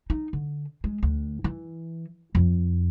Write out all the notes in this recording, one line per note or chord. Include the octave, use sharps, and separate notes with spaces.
D#4
D3
G#3
D2
E3
F2